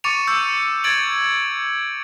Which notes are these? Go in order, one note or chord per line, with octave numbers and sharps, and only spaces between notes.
C#6 D6 A6 C#7 D#7 F7
E6 G6 C#7
G#6 A6 D7 F#7